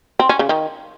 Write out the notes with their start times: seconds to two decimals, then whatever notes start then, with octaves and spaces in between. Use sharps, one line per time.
0.19 C4
0.29 C#4
0.39 C#3
0.49 D#3